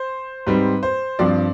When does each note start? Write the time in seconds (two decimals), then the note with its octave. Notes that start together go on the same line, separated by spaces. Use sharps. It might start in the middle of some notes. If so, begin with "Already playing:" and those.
Already playing: C5
0.47 G#2 G3 C4 B4
0.83 C5
1.19 G2 F3 C4 D5